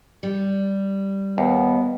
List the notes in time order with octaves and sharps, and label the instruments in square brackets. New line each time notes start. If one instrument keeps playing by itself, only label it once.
[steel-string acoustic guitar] G3
[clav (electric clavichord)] D#2 [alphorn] B3